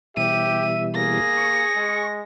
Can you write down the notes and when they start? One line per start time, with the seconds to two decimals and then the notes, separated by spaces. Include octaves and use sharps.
0.17 B2 E3 G3 G4 E5 D#7
0.95 A#3 G#4 A#6
1.37 C#6
1.76 G#3